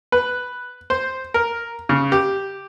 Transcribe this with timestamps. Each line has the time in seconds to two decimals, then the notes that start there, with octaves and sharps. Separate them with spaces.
0.12 B4
0.90 C5
1.34 A#4
1.89 C#3
2.12 G4